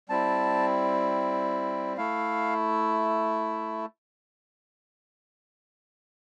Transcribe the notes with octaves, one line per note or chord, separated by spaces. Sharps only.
G3 C4 E4 A5
A3 E4 F5